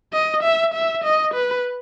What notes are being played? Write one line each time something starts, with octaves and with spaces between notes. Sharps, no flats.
D#5
E5
E5
D#5
B4